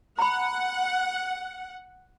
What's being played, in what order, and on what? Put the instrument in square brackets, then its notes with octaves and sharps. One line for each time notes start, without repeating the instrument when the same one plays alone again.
[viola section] F#5 [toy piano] A#5 B5